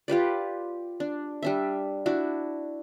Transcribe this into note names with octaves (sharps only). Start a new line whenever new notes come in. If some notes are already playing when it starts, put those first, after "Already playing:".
F4 G4 B4 D5
D4
G3 D4 E5
D4 E4 F#4